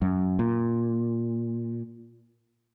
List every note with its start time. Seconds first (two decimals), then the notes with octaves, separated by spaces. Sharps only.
0.02 F#2
0.39 A#2